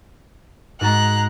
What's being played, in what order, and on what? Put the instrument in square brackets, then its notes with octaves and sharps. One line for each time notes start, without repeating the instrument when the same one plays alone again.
[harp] G#2 F#4 A6 [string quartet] G#3 A#5 F#6